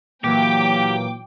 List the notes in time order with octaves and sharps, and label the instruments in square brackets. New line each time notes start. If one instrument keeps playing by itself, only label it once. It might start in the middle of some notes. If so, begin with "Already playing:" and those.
[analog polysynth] A#2 E3 F#3 [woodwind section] A#3 [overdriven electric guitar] G4 [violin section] G5 D6